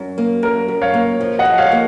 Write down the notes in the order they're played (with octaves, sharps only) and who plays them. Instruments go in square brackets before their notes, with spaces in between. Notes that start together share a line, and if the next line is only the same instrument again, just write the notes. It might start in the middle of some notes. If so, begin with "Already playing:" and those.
Already playing: [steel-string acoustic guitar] F#2
A#3
[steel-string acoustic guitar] F#2 [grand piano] A#4
[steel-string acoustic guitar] F#2
[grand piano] C#5 F5
[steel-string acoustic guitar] A#3
F3
[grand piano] D#5 F#5
[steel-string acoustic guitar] F3
[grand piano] C#5 F5
[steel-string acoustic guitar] A#3